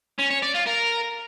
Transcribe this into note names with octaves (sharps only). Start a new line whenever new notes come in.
C#4
C#5
D5
F4
A#4